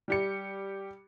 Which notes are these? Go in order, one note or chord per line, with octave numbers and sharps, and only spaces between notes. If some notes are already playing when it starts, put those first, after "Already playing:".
G3 G4 C#7